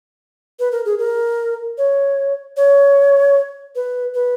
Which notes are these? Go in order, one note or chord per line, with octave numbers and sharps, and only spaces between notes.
B4
A#4
G#4
A#4
C#5
C#5
B4
B4